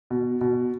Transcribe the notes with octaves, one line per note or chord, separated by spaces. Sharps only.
B2
B2